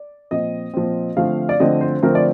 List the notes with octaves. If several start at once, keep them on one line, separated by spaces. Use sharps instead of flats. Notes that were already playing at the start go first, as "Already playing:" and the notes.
Already playing: D5
A#2 F3 C4 D#5
A#2 F3 C4
D3 F3 A3 C4 F5
D5
D3 F3 A3 C4 D#5
C5
D3 F3 A3 C4 A#4
D5